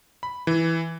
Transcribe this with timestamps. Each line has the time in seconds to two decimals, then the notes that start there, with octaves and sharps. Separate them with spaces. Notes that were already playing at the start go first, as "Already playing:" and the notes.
0.23 B5
0.47 E3